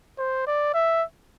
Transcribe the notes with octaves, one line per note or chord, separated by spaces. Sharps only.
C5
D5
E5